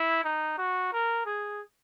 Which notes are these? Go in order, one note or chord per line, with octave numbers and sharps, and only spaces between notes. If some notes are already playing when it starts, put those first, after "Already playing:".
Already playing: E4
D#4
F#4
A#4
G#4